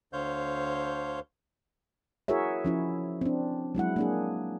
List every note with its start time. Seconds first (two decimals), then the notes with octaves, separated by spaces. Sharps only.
0.13 D2 D3 C5 C#5 F5 G6
2.28 E4 F#4 G#4 A#4 C#5 E5
2.65 F3 C#4 E4
3.21 C4 D4
3.75 F#3 G#3 E4 F#5
3.96 A#3 D4 G#4